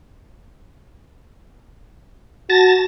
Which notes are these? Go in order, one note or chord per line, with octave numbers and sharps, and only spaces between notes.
F#4 A5 A6 A#6